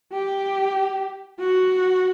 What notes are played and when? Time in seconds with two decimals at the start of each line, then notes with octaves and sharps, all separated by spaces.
0.12 G4
1.40 F#4